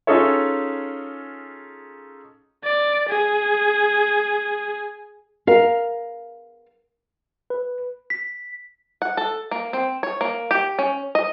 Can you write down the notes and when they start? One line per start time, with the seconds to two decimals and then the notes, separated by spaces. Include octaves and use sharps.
0.07 C#4 D#4 F4 G#4 A4 C#5
2.64 D5
3.09 G#4
5.47 A#4 F5
7.50 B4
8.10 B6
9.02 F#5
9.17 A4
9.51 A#3
9.73 C4
10.03 C#5
10.21 A#3
10.51 G4
10.79 C#4
11.15 D#5